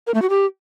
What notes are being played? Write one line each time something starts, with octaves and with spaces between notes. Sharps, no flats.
A#4
A3
F#4
G4